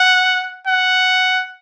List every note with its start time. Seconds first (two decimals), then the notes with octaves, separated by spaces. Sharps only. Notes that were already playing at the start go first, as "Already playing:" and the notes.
Already playing: F#5
0.67 F#5